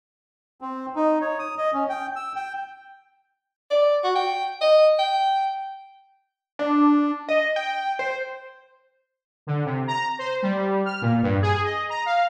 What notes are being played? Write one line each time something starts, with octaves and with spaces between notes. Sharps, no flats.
C4
D#4
C#5
D#6
D#5
C#4
G5
E6
G5
D5
F#4
G5
D#5
G5
D4
D#5
G5
C5
D3
C3
A#5
C5
G3
F6
A#2
G2
G#4
D#5
A#5
F5